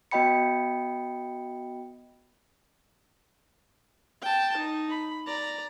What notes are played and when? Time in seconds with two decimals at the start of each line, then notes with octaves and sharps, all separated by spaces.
0.11 B3 F#4 D#5 G5 B5 C#7
4.22 G5 A5
4.57 D#4
4.90 B5
5.26 D5 A#5